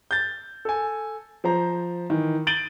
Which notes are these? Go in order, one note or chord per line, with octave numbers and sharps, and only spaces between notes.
G6 A6
A4 G#5
F3 C5 A#5
D#3 E3
G6 A6 D7 D#7 F#7 G7